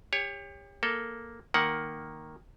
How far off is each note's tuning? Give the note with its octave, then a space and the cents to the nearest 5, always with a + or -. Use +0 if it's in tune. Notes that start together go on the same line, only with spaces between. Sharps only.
G4 +35 C#5 +0
A#3 +0 A4 +0
D#3 +0 A#3 +0 F#5 +0